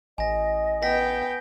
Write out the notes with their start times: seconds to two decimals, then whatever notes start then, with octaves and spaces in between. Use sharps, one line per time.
0.18 A1 D#5 G#5 A#6
0.83 B3 G5 A#6 B6